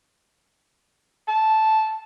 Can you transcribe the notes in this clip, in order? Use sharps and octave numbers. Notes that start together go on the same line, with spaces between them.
A5